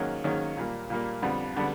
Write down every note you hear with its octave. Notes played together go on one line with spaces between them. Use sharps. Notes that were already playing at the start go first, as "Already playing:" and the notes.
Already playing: G#2 D#3 F#3 A#3 C#4
G#2 D#3 F#3 A#3 C#4
A#2 G3 A#3
A#2 G3 A#3
F2 D3 G3 B3
D3 G3 B3